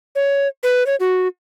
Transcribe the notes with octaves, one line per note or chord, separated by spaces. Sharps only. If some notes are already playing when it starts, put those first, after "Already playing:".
C#5
B4
C#5
F#4